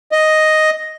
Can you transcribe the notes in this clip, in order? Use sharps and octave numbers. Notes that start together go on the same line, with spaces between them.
D#5